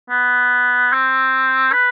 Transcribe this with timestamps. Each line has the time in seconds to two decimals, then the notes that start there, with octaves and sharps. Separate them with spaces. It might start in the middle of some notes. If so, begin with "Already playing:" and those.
0.10 B3
0.92 C4
1.72 B4